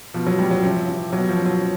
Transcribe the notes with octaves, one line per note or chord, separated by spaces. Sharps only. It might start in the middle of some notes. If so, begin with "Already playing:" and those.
B2 F3
F#3
G3
F#3
C3 F3
E3
B2 F#3
F3
F#3